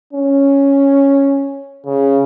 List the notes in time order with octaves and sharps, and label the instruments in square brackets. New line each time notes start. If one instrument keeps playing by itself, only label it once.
[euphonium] C#4
C#3